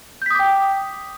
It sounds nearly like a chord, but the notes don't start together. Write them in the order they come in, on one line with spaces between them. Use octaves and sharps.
G6 B6 D#6 D6 G5